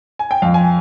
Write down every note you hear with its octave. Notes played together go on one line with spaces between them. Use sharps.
G#5
G5
F2 F5
G#5